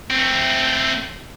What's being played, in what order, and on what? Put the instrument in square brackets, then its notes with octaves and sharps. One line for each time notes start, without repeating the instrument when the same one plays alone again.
[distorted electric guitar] A3 C4